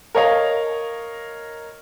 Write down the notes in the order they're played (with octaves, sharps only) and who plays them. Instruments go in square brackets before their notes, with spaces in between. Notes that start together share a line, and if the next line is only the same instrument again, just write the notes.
[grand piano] A#4 C#5 D#5 F5